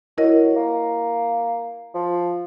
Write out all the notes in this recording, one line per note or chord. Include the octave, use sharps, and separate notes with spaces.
F#3 E4 A#4 D#5
A#3
F3